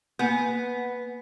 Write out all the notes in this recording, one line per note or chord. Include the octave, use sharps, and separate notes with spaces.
A#3 B3 G#5